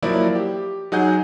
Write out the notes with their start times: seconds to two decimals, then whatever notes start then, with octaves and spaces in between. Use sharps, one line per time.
0.03 F3 F#3 A#3 E4 D5
0.35 G4
0.92 F#3 D#4 G#4 F#5 G#5 G6